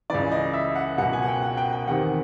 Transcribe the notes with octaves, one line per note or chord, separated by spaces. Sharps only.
C#2 C#3 E3 D5
D#5
E5
F#5
C#2 B2 F#3 F#5
G#5
F#5
G5
F#5
G5
G5
E2 C3 D#3 F#5